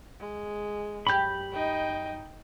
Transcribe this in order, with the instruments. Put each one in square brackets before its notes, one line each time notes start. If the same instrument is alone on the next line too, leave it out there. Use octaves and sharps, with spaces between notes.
[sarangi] G#3
[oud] F#2 G4 [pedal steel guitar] B5 G6
[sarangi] D#4 [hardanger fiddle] D#5 G5